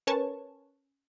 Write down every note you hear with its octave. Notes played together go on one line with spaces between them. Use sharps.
C#4 A#4 B4 C#5 A5 C#6